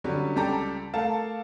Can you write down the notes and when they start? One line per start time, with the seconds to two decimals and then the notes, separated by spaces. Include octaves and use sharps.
0.04 D3 F#3 G3 C#4
0.36 C#2 G3 G4 A4 A#5 D6
0.94 A3 A4 A#4 F5 A5